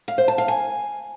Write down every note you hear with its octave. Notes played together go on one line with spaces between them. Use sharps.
F5
C5
A5
F5
G#5